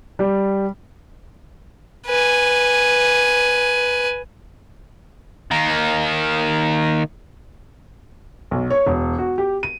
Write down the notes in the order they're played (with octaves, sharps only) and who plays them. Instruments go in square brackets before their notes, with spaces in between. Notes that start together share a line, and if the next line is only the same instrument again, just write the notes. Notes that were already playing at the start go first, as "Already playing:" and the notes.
[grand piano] G3
[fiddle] B4 G#5
[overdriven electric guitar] D#3 A#3
[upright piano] B1
C#5
E1
F#4
G4
D#7